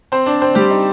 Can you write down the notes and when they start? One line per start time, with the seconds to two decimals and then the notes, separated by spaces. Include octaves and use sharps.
0.12 C4 C5
0.26 D4 D5
0.42 C4 C5
0.55 G3 G4
0.70 D#4